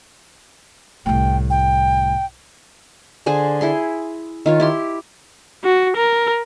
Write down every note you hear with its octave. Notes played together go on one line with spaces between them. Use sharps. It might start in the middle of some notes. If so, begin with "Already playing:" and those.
C2 A2 G5
G5
D3 G#4 C5 G#5
E4 G#4 C6
D#3 F4 C#5
E4 G4 C6
F#4
A#4